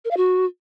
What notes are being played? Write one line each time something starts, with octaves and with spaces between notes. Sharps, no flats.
A#4
F5
F#4